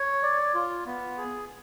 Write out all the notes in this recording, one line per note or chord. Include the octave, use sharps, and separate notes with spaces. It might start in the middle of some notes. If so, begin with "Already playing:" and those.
Already playing: C#5
D5
F4
B3
G#4